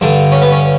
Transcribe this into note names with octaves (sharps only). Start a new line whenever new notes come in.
G2 D3 D4
C#4
B3
C#4